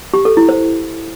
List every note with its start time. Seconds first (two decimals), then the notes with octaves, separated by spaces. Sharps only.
0.14 G4
0.25 A4
0.37 E4
0.49 C5